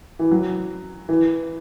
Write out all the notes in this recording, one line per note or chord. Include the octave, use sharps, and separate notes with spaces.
E3
F#3
E3